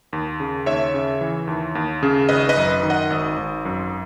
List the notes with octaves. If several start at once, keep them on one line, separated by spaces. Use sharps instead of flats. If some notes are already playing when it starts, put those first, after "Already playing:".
D#2
C#3
D#2 C#5 E5
C#3
E3
D#2
D#2
C#3
G#1 B4 D#5
B4 D#5
F#2
D#3
D#5 F#5
G#1
G#1
F#2